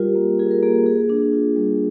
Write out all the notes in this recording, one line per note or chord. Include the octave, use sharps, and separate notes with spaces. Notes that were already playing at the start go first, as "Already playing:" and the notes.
Already playing: G3 F4 G4 A#4
A#3
F4 G#4
A#4
A#3 G#4
A#3 G#4
D4
F4
G3